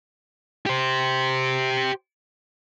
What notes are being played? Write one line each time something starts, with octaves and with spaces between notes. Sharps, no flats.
G4 C5